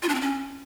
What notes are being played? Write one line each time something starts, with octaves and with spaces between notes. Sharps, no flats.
F4
D4
C4
C#4